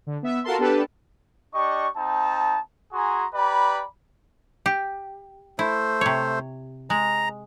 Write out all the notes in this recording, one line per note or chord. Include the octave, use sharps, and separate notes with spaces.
D3
B3 E5
F4 F#4 A4 A#4 A5 C6
B3 D4 G4 A4 B4 A5
D4 G4 D#5 C#6
C4 D#4 A5
F#4 G#4 G#5 A#5 C6
G4 B4 D5 A#5 B5
G4
A3 E4 C5
C3 C#5
G#3 A#5